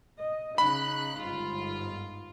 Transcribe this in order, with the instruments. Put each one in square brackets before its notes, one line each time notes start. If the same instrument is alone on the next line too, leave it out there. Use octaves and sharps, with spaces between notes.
[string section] D#5
[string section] C#3 D#4 F#6 [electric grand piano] B5
[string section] G1 G#2 F4